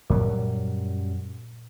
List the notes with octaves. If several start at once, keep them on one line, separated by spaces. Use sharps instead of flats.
F#2 A#2 F#3 G3